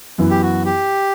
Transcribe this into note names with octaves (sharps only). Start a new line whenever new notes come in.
F#2 E3 B3 E4
G4
F#4
G4